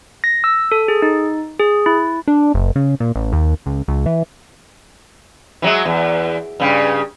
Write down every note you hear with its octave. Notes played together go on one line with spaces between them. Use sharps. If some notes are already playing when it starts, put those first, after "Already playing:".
A#6
E6
A4
G#4
D#4
G#4
E4
D4
F#1
C#3
A#2
A1
D#2
C#2
C#2
E3
E3 F#3 G#3
E2
G2 C#3